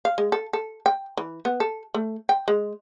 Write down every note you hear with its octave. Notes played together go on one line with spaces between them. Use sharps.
F5
G#3
A4
A4
G5
E3
B3
A4
A3
G5
G#3